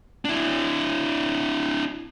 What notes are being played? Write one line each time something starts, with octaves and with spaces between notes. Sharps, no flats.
D4 E4